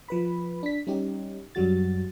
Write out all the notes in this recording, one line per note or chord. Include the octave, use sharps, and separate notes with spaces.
F3 B4 B5
D4 B6
G3 C#4 D#4 G4
F#2 F#3 G3 F#4 A6